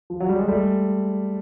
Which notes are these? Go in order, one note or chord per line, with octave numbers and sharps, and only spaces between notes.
F3
F#3
G3
G#3
G3 A3